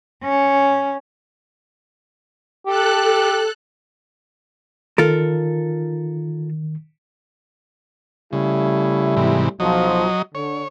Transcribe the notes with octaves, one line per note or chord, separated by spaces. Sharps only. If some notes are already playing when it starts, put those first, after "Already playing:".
C#4
G4 A4 F#6
D#3 F4 A4 A#4
C#3 G3 A3 E4
G#2 C3 E3
B1 F3 F#3 D#5
D3 C#5